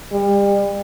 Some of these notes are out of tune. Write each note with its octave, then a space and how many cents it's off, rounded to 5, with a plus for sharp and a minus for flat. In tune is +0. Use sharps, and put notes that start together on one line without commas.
G3 +35